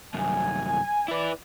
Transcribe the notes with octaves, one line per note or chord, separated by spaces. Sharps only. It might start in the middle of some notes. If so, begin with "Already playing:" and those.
C2 F#2 G#5
E4 B4 D5